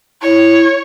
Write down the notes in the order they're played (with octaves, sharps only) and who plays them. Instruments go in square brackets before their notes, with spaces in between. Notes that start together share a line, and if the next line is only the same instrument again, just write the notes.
[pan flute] E4 [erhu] C#5